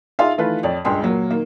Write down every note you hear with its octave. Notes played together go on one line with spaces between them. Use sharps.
D#4 F4 G#4 E5 F5 C6
D#3 E3 A3 F4 B4
F2 C#5 D5 G5
C#2 G2 G#3 G#4 G5 C6
A#2 F#3 A#3
D#3 A#3